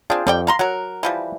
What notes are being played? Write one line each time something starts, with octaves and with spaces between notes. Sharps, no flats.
C4 D4 F4 G#4 G5
F2 G3 D5 G5
F5 A#5 C6
F#3 A#4 F#5
E3 F3 G3